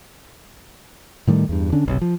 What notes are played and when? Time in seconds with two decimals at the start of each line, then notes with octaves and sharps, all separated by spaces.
1.27 A2 D#3 G3 A3
1.49 E2 G2
1.72 D3 C#4 D4
1.86 F#1 B1 C3
2.01 F3